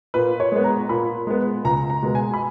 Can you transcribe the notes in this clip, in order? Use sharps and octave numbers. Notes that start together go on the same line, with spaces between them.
A#2 B4
C#5
G#3 B3
A#5
A#2 B5
G#3 B3
C#2 A#5
A#5
B2 G#3 B3
G#5
B5